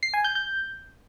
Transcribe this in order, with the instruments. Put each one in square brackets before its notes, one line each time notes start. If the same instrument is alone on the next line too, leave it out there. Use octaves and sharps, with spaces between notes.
[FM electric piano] C7
G#5
G6
G6